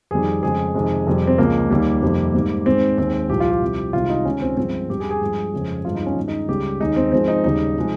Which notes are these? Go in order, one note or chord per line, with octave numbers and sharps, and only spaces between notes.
F2 D#3 G3 G#4
F2 C#3 G#3 G#4
F2 C3 D#3 G#3
F2 C3 G3
C4
C#2 C#3 F3 G#3 A#3
D#2 D#3 G3
F2 C3 D#3 G3
G#2 G3
G#2 D#3 G#3 C4
D#2 D#3 G#3 C4
C2 A#2 F3 G4
F4
G4
C2 C3 F3
C2 C3 D#3 G#3 F4
D#4
C#2 C3 D#3 C#4
C4
G2 F3 G#3 C4
G2 G3 G4
G#4
G#4
G2 F3 G#3
F2 C#3 G#3
G2 F3 G#3 F4
D#4
C#4
G2 D#3 G#3
D#4
C#2 C#3 G3 G4
D#2 D#3 G#3 D#4
C4
G#2 F3 G#3 C4
D#4
D#2 C#3 G3 D#4
C3 F3 G#3